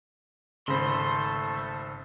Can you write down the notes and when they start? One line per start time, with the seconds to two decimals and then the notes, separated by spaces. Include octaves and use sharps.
0.68 G#1 C#3 A3 A4 C5 B5 C6